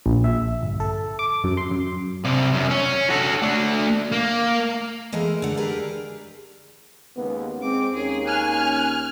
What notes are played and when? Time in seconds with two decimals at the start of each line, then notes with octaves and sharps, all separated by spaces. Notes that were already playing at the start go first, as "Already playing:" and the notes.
0.06 A#1
0.24 E5
0.63 G1
0.80 A4
1.19 D6
1.44 F#2
1.57 C6
1.71 F#2
2.25 C3 D5
2.54 F#2
2.70 C#4
3.10 F#4 A4
3.42 A3 D4
4.12 A#3
5.12 E3 G#3 A3 A#4
5.42 D3 F#5
5.57 D4 G4 G#4 A#4 B4
7.17 D#2 C#3 G#3 B3
7.62 G#3 C4 D6
7.94 D#2 D#3 A#3 C#4 G#4
8.27 G#5 F6 F#6 G#6